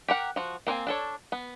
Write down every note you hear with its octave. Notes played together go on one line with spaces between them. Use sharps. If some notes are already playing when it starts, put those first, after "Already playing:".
G4 A#4 F#5
F3 F#4
A#3 C4 C#5 G#5
D4 A4 C#5
B3